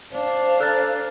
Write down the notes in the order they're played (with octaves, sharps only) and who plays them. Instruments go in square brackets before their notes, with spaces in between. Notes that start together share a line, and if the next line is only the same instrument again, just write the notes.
[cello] D4 F5 [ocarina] C5
[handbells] A4 A6 [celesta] A#5 F6 F#6